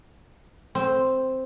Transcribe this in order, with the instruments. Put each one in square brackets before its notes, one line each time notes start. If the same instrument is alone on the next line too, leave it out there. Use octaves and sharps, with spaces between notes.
[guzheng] C4